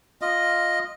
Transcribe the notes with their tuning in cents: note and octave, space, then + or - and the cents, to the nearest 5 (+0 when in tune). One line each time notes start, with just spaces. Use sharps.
F4 +0 D#5 +0